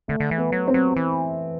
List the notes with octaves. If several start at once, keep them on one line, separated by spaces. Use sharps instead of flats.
D3 A3
D3
E3
B3
F#3
C4
F#3
E3